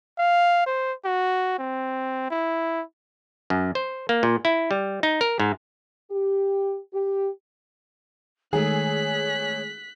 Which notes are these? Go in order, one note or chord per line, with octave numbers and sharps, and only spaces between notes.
F5
C5
F#4
C4
E4
F#2
C5
A#3
A#2
E4
G3
D#4
A#4
G#2
G4
G4
D#3 G#3 A3 G#4 C#5 F#6 B6